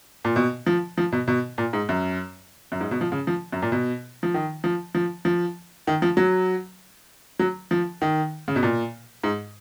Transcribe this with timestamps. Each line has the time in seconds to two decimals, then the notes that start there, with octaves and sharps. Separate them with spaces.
0.25 A#2
0.36 B2
0.66 F3
0.98 F3
1.12 B2
1.28 B2
1.58 A#2
1.73 G#2
1.89 F#2
2.72 F#2
2.81 G#2
2.91 B2
3.01 F3
3.12 C#3
3.27 F3
3.52 F#2
3.62 A#2
3.72 B2
4.23 F3
4.34 D#3
4.64 F3
4.95 F3
5.25 F3
5.87 D#3
6.02 F3
6.17 F#3
7.39 F#3
7.71 F3
8.02 D#3
8.48 C#3
8.56 B2
8.63 A#2
9.24 G#2